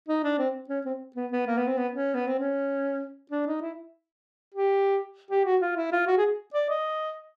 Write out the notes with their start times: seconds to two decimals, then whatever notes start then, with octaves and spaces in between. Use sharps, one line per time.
0.09 D#4
0.24 D4
0.39 C4
0.69 C#4
0.86 C4
1.16 B3
1.32 B3
1.47 A#3
1.58 B3
1.68 C4
1.77 B3
1.93 C#4
2.15 B3
2.28 C4
2.39 C#4
3.31 D4
3.47 D#4
3.61 E4
4.54 G4
5.31 G4
5.45 F#4
5.61 F4
5.76 E4
5.92 F4
6.07 F#4
6.17 G#4
6.54 D5
6.69 D#5